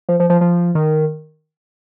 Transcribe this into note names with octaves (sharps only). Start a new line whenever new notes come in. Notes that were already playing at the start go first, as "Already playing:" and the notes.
F3
F3
F3
F3
D#3